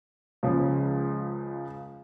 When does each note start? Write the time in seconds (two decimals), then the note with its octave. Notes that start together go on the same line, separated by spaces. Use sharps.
0.43 C#2 C#3 F3